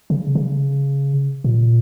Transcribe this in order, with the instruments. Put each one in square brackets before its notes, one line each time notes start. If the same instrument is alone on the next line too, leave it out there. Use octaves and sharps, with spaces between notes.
[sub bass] C#3
C#3
A#2